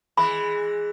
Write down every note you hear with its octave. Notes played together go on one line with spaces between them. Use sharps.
E3 G#3 B5